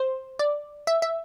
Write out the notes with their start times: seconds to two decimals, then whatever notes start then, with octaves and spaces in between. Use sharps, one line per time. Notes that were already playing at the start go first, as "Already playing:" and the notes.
Already playing: C5
0.39 D5
0.87 E5
1.02 E5